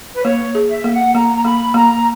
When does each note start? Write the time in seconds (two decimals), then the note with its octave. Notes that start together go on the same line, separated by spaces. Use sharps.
0.14 B4
0.25 A#3 C#5
0.55 G#4
0.69 E5
0.84 A#3
0.92 F#5
1.15 A#3 A#5
1.36 A#5
1.44 A#3 B5
1.74 A#3 A#5